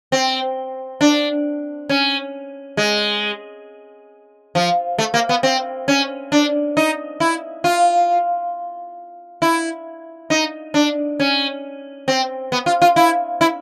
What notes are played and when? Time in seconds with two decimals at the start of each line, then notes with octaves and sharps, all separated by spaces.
0.12 C4
1.01 D4
1.89 C#4
2.77 G#3
4.55 F3
4.98 A3
5.14 A#3
5.29 B3
5.43 C4
5.88 C#4
6.32 D4
6.77 D#4
7.20 E4
7.64 F4
9.42 E4
10.30 D#4
10.74 D4
11.19 C#4
12.08 C4
12.52 B3
12.66 F4
12.82 F4
12.96 E4
13.41 E4